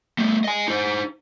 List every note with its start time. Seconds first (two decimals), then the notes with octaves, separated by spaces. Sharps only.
0.19 G3 A3
0.44 D#5 G#5
0.68 D#4 C5